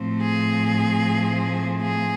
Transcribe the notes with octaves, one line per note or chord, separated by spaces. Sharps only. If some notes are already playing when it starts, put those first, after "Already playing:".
Already playing: A2 F3 A3 C4
G#4
G#4